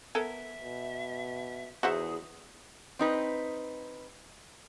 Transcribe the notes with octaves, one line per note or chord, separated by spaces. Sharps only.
B3 A4 A#4 E5 G#5
B2
E2 E3 D#4 F#4 G#4 C5 E5 F#5
C4 D#4 B4